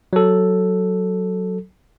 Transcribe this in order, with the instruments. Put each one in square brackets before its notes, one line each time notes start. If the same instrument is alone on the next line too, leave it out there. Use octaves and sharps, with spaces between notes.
[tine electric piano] F#3 A4